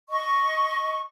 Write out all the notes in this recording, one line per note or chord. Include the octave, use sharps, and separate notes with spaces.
D#5 C#6